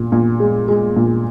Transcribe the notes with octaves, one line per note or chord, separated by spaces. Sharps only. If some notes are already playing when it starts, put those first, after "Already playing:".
Already playing: A#2
A#2
G#3
G#3
A#2